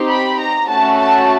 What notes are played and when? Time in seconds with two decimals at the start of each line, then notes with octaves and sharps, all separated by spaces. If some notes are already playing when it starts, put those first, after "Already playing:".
Already playing: C4 D#4 G4
0.09 B5
0.38 A#5
0.68 A3 C#4 F#4 A5
0.97 A5